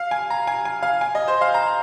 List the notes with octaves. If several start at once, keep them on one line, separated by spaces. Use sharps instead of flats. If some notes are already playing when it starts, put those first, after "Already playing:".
Already playing: F5
G#5
A#5
G#5
G#5
F5
G#5
D#5
C5
F5
A#5